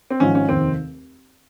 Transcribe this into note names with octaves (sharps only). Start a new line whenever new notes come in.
C4
G#1 G#2 F3 C#4
C#4
F1 D#2 D#3 C4